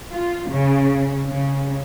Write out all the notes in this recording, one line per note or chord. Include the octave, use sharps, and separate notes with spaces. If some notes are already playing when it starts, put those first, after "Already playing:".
F4
C#3
C#3